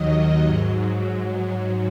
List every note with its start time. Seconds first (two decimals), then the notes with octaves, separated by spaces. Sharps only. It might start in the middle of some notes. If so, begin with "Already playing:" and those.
Already playing: D#2 D#3 F#3 D#5
0.45 G#2 F#3
1.04 G#2 F#3